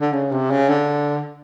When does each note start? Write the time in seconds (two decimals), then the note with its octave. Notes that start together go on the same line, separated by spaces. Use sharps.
0.01 D3
0.13 C#3
0.32 C3
0.51 C#3
0.69 D3